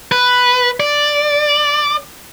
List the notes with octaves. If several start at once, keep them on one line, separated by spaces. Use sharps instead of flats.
B4
D5